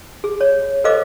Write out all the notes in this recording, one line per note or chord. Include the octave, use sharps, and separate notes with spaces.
G#4
C#5
A4 B4 C5 D#5 F5 D6